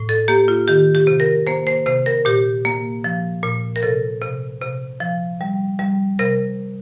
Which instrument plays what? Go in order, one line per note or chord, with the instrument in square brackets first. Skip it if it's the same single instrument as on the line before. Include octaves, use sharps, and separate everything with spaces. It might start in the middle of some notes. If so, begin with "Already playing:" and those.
Already playing: [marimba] A2
A4
A#3 G4
F4
D#3 G4
G4
C3
A#4
A#3 C5
C5
C3 C5
A#4
A#2 G4
A#3
F3
A#2
A#4
C3 A4
C3
C3
F3
G3
G3
C3 A#4